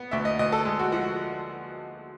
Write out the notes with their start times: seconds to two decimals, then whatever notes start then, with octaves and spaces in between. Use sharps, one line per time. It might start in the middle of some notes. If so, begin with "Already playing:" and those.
Already playing: B3
0.11 D2 E5
0.25 D#5
0.39 D2 D#5
0.52 A4
0.65 G#3
0.79 F#4
0.92 F3 F#4